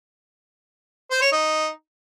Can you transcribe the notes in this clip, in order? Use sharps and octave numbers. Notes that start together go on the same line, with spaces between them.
C5
C#5
D#4